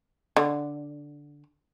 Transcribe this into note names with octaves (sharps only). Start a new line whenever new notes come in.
D3